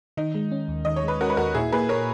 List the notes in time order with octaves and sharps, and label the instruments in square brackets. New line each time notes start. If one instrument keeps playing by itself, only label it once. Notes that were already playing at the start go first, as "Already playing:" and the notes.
[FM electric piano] D#3 [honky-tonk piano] D#4
[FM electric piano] G#3
C#4
D#2
[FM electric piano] D#3 [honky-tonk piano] D#5
[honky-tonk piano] C#5
[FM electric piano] G#3 [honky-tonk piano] B4
[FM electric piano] C#4 [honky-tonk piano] F#4 A#4
[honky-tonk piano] B4
[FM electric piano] D#2 [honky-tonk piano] F#4 A#4
[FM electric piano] A#2 [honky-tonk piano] E4 G#4
[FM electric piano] A#3 [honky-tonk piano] G#4 B4
[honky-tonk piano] A#4 C#5